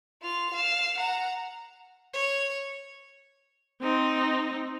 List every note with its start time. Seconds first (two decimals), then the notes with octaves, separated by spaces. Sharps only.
0.22 F4 F7
0.53 F5 E7
0.97 F#5 A#5
2.13 C#5
3.81 C4 D#4